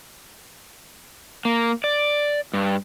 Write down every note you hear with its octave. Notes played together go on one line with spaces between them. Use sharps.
A#3
D5
G2